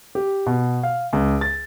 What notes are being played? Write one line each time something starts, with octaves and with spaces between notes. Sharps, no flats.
G4
B2
F5
C#2
A6